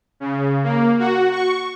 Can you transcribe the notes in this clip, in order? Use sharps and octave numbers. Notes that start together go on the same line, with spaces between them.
C#3
A#3
F#4
C#6